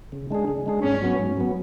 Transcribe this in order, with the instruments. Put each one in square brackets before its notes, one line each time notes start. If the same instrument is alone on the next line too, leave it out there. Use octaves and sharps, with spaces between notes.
[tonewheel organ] C#3
G#3 D4 G#4
C#3
G#3 D4 G#4
[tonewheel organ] G#2 [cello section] C#4
[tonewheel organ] F#3 B3
G#2
F#3 B3